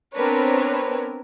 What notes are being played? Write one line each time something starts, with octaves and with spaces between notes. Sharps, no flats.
B3 C4 D4 A#4 B4 C#5